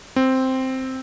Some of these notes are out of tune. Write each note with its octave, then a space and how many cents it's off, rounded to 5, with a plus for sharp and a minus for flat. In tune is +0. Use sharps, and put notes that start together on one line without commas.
C4 +0